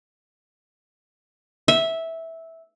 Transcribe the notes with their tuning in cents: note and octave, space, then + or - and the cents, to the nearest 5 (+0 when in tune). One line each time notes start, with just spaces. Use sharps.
E5 -10